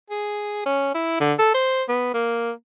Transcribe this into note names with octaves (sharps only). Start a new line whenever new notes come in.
G#4
C#4
E4
D3
A4
C5
B3
A#3